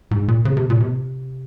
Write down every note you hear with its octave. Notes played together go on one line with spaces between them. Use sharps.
G#2
A#2
C#3
C3
A#2
C3